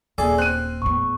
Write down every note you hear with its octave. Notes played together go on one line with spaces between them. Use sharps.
D#1 G#4 A4 D5 E5
C4 F#6 D#7
E2 A2 C#6